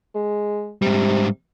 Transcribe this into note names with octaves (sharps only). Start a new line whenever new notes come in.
G#3
G#2 C3 G3